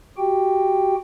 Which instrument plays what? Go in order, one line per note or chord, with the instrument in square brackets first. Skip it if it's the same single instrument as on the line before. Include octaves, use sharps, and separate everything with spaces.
[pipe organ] F#4 G4 G5